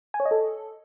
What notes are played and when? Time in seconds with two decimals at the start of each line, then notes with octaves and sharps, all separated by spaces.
0.14 G#5
0.20 C#5
0.25 D#5
0.31 A4